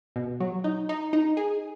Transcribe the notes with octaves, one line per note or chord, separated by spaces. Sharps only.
B2
F#3
D#4
D#4
D#4
G#4